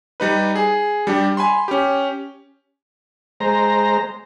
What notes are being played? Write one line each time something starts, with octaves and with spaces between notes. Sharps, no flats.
G3 D#4 B4
G#4
G3 D4 G4
G#5 B5 C6
C#4 G4
G#3 C5 A#5